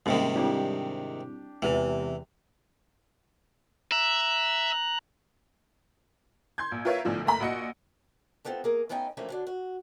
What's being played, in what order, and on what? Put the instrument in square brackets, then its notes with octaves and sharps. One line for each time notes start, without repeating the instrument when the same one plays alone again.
[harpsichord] G#2 C3 D#3 [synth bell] G3 A#3 C#4
[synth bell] G3 C4 E4 [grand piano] D4 G4
[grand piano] E2 C3 F7 [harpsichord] E3 [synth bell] G#3 G4 B4
[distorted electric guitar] E5 [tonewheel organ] A#5 F#6
[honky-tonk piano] C6 G6 G#6
A#1
F4 A#4 B4 C#5 E5 F5
B1 A2 D3 F3
F#1 A3 A#5 B5
A#1 F#4 D#5 C#7
[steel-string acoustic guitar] A3 B3 C4 F4 F#4 A4
A#3 G#4 A#4
A3 B3 C#4 D#4 G5 G#5
G2 E3 F3 A3 A#3 C#4
D3 F#3 D4
F#4